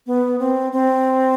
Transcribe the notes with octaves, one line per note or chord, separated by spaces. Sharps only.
B3
C4
C4